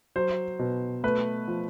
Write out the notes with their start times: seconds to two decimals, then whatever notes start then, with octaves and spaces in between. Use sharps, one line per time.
0.16 F#3 C5
0.59 B2
1.04 A3 B4
1.47 F3